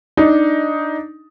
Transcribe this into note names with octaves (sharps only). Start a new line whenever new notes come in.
D4 D#4